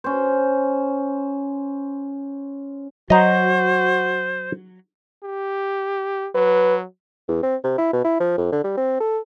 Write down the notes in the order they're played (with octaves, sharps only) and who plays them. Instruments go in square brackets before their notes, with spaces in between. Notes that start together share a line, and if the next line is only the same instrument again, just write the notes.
[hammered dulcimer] C#4 C5
[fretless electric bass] F#3 [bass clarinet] F#4 [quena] C5 [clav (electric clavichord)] D#5 A#5
[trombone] G4
[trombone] F#3 [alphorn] B4
[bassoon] E2
C4
C3
E4
B2
E4
F3
F2
D3
G3
C4
A4